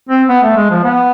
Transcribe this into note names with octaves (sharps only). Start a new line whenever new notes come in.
C4
B3
A3
G#3
F3
B3